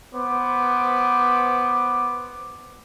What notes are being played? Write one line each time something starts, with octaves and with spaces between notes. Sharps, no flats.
B3 C5 D6